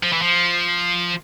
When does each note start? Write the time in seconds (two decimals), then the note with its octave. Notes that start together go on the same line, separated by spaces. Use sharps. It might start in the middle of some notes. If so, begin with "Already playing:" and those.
0.03 F3
0.13 E3
0.22 F3